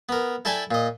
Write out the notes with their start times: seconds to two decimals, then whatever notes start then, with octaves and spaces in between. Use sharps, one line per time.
0.09 B3 A#4
0.45 E4 A4 D5 G5 G#5 B5
0.71 A#2 D#5